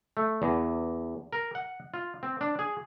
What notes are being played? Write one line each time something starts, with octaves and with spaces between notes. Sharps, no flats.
A3
E2
A#4
F#5
F4
C4
D4
G#4